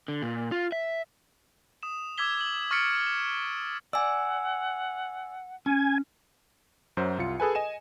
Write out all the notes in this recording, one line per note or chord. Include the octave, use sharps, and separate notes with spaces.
D3
A#2
F4
E5
D#6 E7
D6 E6 G#6 B6 G7
F#7
C#6 F6 A6 B6 C#7 D7
E7
D5 F#5 G#5 E6
C#4 G#5
F#2 F#3 C5
C2 F4 C#7
G#4 A4 B4 G#5
D#5 G#5 E7